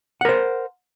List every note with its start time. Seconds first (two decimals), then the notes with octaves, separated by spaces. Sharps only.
0.21 F#5
0.25 A#4
0.29 C5